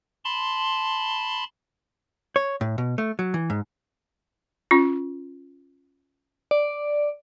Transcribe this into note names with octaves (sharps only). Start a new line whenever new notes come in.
A5 B5 C6
C#5
A2
B2
A3
F#3
E3
G#2
C#4 F4
D5